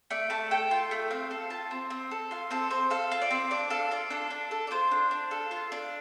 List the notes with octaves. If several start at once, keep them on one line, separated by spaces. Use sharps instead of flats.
A3 D5
A3 A5
A4 G5
F4
A3
C4 F5
A4 F5
F4 A5
C4
C4
A4
F4 F5
C4 A4
C4 C5
A4 F5
F4
D5
C4
D4 D5
A4 F5
F4 D5
D4 A4
D4
A4
D5
F4 C5
D4
D4
A4 F5
F4
D4